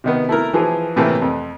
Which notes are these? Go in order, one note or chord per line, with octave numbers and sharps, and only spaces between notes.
C3 D#3 B3
A3 E4 A#4
E3 F3 G#4
A2 C3 E3 A3 A#3
F2